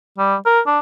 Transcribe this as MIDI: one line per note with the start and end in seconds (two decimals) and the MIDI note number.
0.18 0.35 55
0.46 0.60 70
0.67 0.79 62